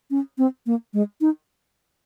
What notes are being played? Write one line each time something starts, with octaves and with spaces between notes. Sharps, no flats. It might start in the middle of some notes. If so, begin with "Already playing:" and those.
C#4
C4
A#3
G#3
D#4